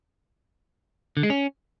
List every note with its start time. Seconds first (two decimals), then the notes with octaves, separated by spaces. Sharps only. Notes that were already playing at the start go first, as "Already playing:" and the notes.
1.17 D3
1.23 G#3
1.30 C#4